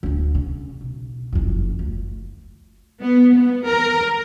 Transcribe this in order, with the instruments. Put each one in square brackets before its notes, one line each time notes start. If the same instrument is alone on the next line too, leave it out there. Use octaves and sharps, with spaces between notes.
[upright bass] D1 D2
C#3
B1
F#1 F2
D2
[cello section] B3
B3
A#4